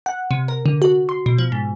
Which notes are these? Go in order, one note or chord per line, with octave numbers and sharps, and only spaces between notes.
F#5
C3
A#4
D3
F#4
C6
B2
F3
G#2